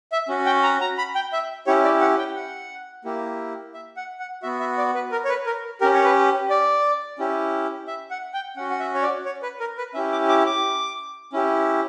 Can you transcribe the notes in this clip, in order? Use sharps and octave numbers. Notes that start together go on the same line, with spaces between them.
E5
C#4 F#4
G5
A#5
A#5
B5
G5
E5
C#4 E4 G4 C#5
D5
F#5
G5
F#5
A#3 E4 G4
E5
F#5
F#5
B3 F#4 E5
E5
D5
B4
A#4
C#5
B4
A#4
C#4 G4 A#4
C#5
B4
D5
C#4 E4 G4
E5
F#5
G5
C#4 F#4 F#5
F#5
E5
C#5
D5
C#5
B4
A#4
B4
C#4 E4 G4 E5
D6
D6
D6
C#4 E4 G4